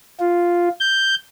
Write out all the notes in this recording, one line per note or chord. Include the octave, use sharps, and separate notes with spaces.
F4
G6